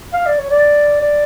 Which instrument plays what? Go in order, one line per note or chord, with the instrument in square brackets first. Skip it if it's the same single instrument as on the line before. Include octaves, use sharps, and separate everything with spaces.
[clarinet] F5
D5
C#5
D5
D5